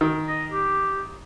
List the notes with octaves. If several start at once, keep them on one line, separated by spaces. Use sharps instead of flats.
D#3
D#5
G4